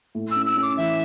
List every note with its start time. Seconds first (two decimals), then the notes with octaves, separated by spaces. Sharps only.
0.15 A2
0.31 C#4 E6
0.46 E6
0.57 C#4
0.62 D6
0.77 E3 E5